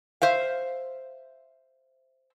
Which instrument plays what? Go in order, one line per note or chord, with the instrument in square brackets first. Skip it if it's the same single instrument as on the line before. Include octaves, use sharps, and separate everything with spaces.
[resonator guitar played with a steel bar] C5 E5 F5